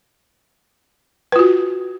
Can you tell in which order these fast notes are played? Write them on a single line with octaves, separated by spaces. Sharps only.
B4 F4 F#4